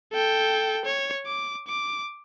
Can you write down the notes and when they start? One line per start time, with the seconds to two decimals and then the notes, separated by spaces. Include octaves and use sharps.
0.13 A4 G5
0.85 C#5
1.26 D6
1.67 D6